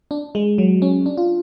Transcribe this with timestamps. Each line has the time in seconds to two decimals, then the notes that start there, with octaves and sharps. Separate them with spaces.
0.11 D4
0.35 G#3
0.58 F#3
0.82 C#4
1.06 D4
1.17 F4